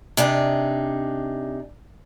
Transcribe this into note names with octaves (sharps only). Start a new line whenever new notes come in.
C3 D4 D#4 G#4